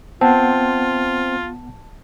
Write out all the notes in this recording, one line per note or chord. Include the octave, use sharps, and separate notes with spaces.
B3 C4 F4 F#5 A5